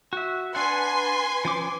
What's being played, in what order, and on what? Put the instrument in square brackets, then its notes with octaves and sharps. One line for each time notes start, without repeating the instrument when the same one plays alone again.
[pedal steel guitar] F#4 E5
[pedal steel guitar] D4 F#5 [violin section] B4 G#5 C6
[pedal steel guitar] F3 C#4 D6